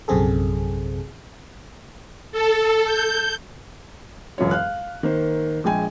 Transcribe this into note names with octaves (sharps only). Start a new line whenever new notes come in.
A#1 F#2 C3 C4 G#4 A4
A4
G6
E1 F#2 F4 C#5
F5 F6 F#6
D#3 A#3 C5
A#1 G#3 G5 G#5